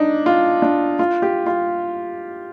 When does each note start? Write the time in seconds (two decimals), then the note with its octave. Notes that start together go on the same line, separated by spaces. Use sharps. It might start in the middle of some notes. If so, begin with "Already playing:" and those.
Already playing: D4 D#4
0.26 F4
0.62 D4
0.99 F4
1.22 G4
1.46 F4